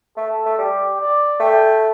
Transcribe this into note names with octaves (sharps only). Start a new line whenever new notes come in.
A3 A4
A3
G3 G4
D5
A3 G5